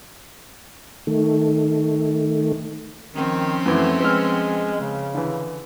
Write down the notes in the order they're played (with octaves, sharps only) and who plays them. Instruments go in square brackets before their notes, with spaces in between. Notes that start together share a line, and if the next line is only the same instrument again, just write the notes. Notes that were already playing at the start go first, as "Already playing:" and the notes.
[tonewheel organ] D#3 A3
[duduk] D#3 [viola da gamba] F3 C4 C#4
[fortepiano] F#2 E3 [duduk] A3
[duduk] G#3 [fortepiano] B4 E6 F6
[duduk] C#3
[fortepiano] D3 E3